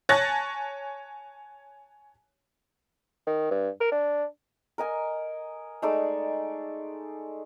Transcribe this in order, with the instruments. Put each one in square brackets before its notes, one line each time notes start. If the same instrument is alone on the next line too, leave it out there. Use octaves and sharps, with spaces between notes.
[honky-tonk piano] C#5 G#5 A5 F#6 A6 A#6
[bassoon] D#3
G2
A#4
D4
[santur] A#4 D#5 G#5
G#3 A3 D#4 D5